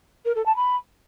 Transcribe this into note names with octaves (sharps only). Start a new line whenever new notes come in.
A#4
A4
A5
B5